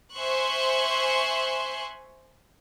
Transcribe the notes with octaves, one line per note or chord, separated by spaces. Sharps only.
C5 E5 G#5 C6 C#6 F#6